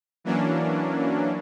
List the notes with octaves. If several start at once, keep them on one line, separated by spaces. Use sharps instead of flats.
E3 F#3 A#3 C#4 D4